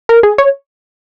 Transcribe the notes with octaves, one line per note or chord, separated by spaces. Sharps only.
A#4
G#4
C#5